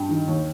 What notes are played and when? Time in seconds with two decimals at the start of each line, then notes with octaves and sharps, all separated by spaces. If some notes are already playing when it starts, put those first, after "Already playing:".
Already playing: G2 G5
0.09 D#3
0.27 D#2